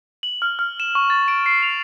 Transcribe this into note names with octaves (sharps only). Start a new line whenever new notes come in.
F#7
F6
F6
E7
C#6
A6
D7
C7
F7